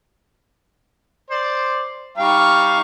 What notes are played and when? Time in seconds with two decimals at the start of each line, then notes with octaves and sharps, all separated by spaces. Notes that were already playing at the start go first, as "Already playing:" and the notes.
1.30 C5 D5
2.17 G3 D#4 F5 G5 C#6